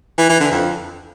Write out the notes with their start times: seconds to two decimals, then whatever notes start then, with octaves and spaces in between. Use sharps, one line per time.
0.18 E3
0.29 E3
0.40 D3
0.51 F2